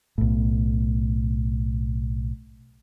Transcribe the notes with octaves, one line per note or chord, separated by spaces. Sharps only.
B1 A2